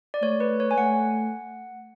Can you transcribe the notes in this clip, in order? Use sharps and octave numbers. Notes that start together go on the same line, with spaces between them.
D5
A3 C#5
B4
C#5
G#5
A3 F#5